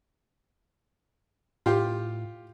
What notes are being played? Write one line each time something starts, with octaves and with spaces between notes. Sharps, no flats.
A2 F4 G4